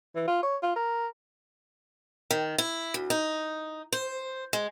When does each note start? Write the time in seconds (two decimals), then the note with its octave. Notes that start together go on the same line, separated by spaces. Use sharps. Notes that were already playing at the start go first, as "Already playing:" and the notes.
0.16 E3
0.27 F4
0.43 C#5
0.63 F4
0.76 A#4
2.31 D#3
2.58 E4
2.94 D2
3.10 D#4
3.92 C5
4.53 G#3